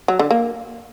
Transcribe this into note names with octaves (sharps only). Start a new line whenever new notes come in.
F#3
D3
A#3